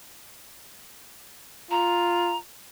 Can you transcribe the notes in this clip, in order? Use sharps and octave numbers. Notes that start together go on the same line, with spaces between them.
F4 A#5